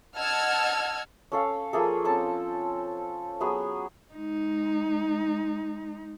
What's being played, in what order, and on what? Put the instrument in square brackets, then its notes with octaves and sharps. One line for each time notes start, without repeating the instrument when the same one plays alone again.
[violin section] D#5 F#5 A5 E6 F6 G#6
[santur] C#4 A4 F5
F3 A#3 G#4 A4
C4 C#4 A4 A5
F#3 B3 G#4
[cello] G#3 D#4